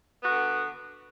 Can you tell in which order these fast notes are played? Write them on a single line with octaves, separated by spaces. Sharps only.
B3 F#4 D3